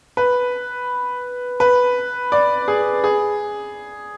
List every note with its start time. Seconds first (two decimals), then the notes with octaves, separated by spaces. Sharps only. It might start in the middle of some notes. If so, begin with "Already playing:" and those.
0.17 B4
1.60 B4
2.32 D5
2.68 G#4
3.04 G#4